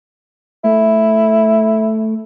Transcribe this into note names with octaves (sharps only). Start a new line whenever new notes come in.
A3 E4